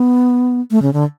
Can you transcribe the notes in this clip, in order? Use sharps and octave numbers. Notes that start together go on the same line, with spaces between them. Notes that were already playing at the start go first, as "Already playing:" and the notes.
Already playing: B3
A3
C#3
D3